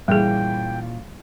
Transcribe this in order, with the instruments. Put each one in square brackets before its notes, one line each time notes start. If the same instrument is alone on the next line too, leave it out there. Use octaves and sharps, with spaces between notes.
[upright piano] G2 E3 [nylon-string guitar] A#2 A#3 C#4 [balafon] G3 G#4 [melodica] G5